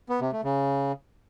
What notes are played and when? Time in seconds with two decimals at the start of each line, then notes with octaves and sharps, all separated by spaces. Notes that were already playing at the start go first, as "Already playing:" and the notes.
0.09 B3
0.21 C3
0.32 A3
0.44 C#3